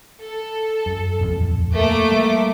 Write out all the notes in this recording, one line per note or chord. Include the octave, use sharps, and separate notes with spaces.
A4
F#2
D#1 A1 F2
A3 A#3 D6
G3